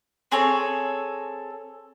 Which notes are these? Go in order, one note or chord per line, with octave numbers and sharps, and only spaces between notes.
C4 G#4 A4 C#5